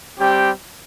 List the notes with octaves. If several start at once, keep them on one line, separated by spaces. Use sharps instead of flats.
G3 C4 G4